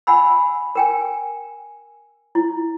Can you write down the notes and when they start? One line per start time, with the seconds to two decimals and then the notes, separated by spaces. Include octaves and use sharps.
0.07 F#5 G#5 B5 E6
0.75 A#4 G5 G#5
2.35 E4